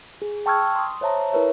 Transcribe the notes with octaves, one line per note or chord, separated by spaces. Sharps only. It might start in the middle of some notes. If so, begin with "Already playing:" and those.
G#4
G5 A5 C#6 E6 F6 G#6
C6 D#6
C5 C#5 E5 A5 A#5
E4 A#4 B4 C#5 E5